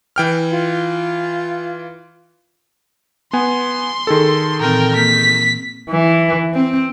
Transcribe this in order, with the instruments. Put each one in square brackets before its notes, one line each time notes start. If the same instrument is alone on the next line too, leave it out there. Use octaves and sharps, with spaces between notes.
[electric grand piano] E3 G5 F6
[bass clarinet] F4
[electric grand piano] B3 G#5 [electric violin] C6
[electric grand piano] D#3 G#4 A4
[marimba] A#2 E3 C4 [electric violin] A#4 G5
[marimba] A#3 G6 [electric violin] B6
[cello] E3
C4